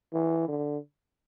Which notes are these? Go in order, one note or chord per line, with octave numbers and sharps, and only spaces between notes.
E3
D3